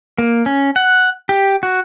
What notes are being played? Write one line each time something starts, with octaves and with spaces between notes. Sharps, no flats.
A#3
C#4
F#5
G4
F#4